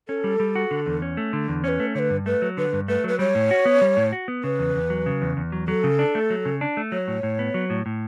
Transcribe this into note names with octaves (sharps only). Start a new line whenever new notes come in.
C#4 A4
G3
G3
F#4
D3
E2
C#4
A3
D3
E2
C#4 B4 C#5
A3
D3 B4 C#5
G2
A3 B4
F#3
D3 B4
G2
A3 B4
F#3 B4
G3 C#5
A2
F#4
B3
G3
A2
F#4
B3
C#3 B4
E2
E2
F#3
C#3
E2
E2
F#3
F#3 A4
C#3
D4
A3
F#3
C#3
D4
A3
F#3 C#5
A2
A2
B3
F#3
A2
A2